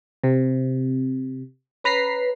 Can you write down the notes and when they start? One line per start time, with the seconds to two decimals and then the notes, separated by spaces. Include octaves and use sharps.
0.24 C3
1.84 C#4 B4 A#5 B6 C7